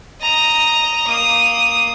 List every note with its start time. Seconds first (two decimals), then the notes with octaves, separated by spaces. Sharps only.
0.21 D#5 A#5
1.08 A#3 D#6